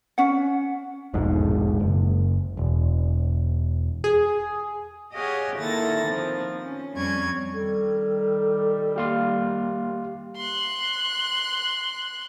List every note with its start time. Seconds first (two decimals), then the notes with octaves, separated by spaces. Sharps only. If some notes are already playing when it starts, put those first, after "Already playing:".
0.18 C#4 F#5
1.14 E1 A#1 G#2 G#3
1.80 F#1
2.57 E1
4.04 G#4
5.15 G4 G#4 C#5 D#5 F5 F#5
5.58 A#2 D#3 E4 A4 A6 A#6
6.08 D#3 F3 C4
6.64 C#4
6.94 F2 G3 C4 C#4 C#6 G#6
7.53 D#3 G3 A4
8.96 A#3 G4 F5 C6
10.37 C6 F#6